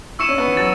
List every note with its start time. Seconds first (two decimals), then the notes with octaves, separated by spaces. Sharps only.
0.19 E4 C#6 E6 C#7 E7
0.28 C#4
0.38 B3
0.48 E3
0.57 F#3 A6